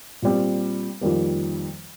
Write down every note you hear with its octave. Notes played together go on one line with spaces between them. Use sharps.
A#2 G3 C4
F2 D#3 G3 A#3